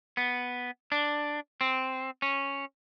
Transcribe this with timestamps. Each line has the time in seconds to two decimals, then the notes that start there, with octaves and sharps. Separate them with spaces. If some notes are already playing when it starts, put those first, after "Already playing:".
0.17 B3
0.92 D4
1.61 C4
2.22 C#4